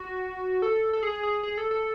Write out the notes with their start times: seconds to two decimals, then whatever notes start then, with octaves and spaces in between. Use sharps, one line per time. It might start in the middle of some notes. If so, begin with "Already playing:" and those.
Already playing: F#4
0.62 A4
0.93 A4
1.03 G#4
1.23 G#4
1.43 G#4
1.57 A4
1.71 A4